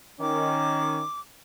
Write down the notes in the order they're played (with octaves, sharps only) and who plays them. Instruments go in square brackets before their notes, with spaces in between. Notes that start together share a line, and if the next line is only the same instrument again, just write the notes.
[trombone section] D#3 C#4 [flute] D6